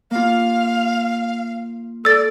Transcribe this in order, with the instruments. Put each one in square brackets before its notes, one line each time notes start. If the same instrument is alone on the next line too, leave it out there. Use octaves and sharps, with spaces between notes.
[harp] A#3 F4 [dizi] F5
[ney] A4 [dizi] D5 [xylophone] E6 A6